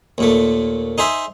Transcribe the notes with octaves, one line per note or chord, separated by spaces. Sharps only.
D#2 A#2 A3
D#4 G#4 C5 E5